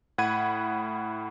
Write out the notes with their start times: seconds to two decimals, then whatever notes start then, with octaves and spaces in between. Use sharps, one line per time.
0.18 A2 F#5 B5 G#6 D#7